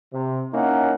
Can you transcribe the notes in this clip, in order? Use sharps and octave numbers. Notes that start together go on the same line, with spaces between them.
C3
A#3 C#4 D#4 E4 F#5